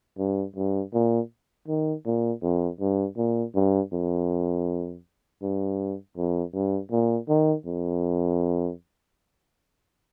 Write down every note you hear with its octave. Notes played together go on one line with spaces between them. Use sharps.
G2
G2
A#2
D#3
A#2
F2
G2
A#2
G2
F2
G2
F2
G2
A#2
D#3
F2